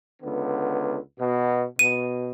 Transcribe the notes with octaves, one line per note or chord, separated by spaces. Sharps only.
C#2 D3 B3
B2
B2 D#7